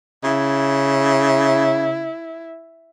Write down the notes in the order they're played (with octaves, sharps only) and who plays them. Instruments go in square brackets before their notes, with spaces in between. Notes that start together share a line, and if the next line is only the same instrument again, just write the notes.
[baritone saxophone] C#3 [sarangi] E4